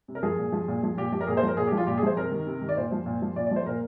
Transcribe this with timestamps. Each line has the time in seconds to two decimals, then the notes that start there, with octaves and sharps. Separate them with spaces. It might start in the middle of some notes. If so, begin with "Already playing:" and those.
0.08 C3
0.15 A#4
0.23 F3 G#4
0.38 A#2
0.53 F3
0.68 A#2
0.83 F3
0.97 A#2 G4
1.12 F3 G4
1.21 A#4
1.27 A#2 G#4
1.37 C5
1.43 F3 A#4
1.57 A#2 G#4
1.67 G4
1.72 F3
1.77 F4
1.87 A#2 G4
1.98 G#4
2.03 F3 C5
2.17 C3 A#4
2.31 D#3
2.47 C3
2.61 D#3
2.69 D5
2.77 A#2 C5
2.92 F3
3.06 A#2
3.22 F3
3.36 A#2 D5
3.47 D5
3.51 F3 C5
3.66 A#2 A#4